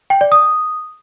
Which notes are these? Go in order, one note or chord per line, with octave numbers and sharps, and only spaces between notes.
G5
D5
D#6